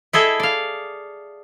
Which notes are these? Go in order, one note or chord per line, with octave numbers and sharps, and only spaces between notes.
E4 G#4 A4 D#5 E5
D5 F5